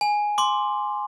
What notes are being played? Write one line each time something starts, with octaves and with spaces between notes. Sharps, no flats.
G#5
C6 D6